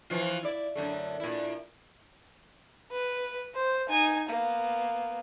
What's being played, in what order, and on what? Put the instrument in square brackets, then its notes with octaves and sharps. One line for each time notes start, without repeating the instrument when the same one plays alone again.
[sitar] E3 F3 F4
E4 D5
F#2 D3 A3
A#2 E4
[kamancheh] B4
C5
D#4 G#5
A#3 B3